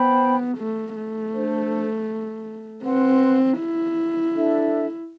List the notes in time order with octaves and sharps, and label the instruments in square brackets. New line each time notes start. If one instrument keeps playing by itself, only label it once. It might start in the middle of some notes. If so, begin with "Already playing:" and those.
Already playing: [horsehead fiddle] B3 [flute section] C5 G5 B5
[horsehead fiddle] A3
A3
[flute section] D4 A4 C5
[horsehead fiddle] C4 [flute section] B4 F#5 C6
[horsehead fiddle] E4
[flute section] D4 A4 E5